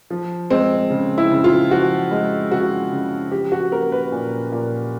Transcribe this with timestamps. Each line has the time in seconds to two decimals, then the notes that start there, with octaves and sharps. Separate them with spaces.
0.10 F3
0.50 G#3 C4
0.90 C#3
1.18 E4
1.31 C#3
1.44 F4
1.71 F3 F#4
2.11 G#3
2.51 C#3 F#4
2.92 C#3
3.31 F3 G4
3.52 F#4
3.71 A#3 A#4
3.92 B4
4.12 A#2
4.52 A#2